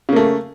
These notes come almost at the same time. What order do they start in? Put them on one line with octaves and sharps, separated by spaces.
C#3 A#3 A3